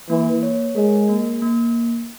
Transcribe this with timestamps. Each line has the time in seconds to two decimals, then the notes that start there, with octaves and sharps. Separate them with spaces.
0.10 E3 A#3
0.43 C#5
0.76 G#3 A#4
1.09 A#3
1.42 A#3